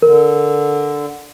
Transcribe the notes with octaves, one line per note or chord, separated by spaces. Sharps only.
D3 A#4